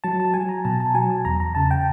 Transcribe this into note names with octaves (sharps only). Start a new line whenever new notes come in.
F#3 A5
A5
F#3 G#5
A#5
B2 A5
A5
F#3 G#5
A5
E2 A#5
A#5
C#3 A5
G5